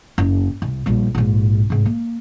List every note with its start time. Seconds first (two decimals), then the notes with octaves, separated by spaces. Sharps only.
0.18 F#1
0.62 C2
0.86 A#1 G3
1.15 A#1 G#2
1.70 G#2 C3
1.86 A#3